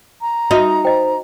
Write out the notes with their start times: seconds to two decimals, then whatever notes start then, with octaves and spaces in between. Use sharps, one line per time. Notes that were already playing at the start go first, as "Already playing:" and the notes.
0.21 A#5
0.51 D#4 F#4 B4 E5
0.85 C5 D#5 G5